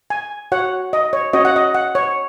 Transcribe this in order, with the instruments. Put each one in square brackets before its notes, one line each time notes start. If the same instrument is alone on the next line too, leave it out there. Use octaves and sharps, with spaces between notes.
[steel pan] G#5
F#4 C#5 F#5
D#5
C#5
C#4 F#4 C#5 D#5
F#5
D#5
F#5
C#5